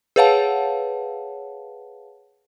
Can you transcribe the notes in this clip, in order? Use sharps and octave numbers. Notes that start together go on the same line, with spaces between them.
G#4 B4 C#5 F5 F#5 A5